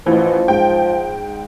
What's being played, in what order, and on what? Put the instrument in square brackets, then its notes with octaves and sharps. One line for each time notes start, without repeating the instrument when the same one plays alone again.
[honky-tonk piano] A1 E3 [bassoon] F3
[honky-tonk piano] G#2 G5